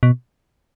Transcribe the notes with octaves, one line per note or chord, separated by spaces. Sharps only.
B2